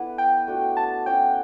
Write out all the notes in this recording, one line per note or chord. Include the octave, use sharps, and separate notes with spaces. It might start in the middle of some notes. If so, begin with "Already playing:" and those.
Already playing: B3 D4 E4 A4 B4 E5
G5
A3 D4 F#4
A5
C#4 F#4 C#5 G5